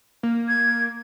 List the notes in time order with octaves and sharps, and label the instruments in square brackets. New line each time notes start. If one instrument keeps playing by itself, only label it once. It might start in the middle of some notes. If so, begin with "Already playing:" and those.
[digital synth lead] A#3
[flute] G#6